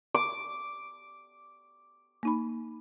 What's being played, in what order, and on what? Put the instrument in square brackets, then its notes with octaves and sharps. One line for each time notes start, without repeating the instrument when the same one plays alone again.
[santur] D6
[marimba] A#3 D#4 B5